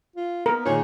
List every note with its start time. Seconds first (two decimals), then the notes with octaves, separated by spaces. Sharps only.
0.16 F4
0.46 B3 A#4
0.65 A#2 D#3 G#4 C#5